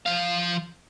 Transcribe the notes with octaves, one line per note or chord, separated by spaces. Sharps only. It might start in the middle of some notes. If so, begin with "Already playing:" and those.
F3 F5